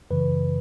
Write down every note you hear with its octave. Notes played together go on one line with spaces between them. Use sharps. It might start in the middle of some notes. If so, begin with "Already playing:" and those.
F#2 C#3 E3 B4